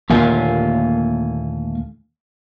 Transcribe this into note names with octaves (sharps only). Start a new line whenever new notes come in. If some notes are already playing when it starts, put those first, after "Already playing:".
D#2 A#2 D3 A3 F5 G#5